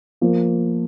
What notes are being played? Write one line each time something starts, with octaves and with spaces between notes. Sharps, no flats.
F3 A#3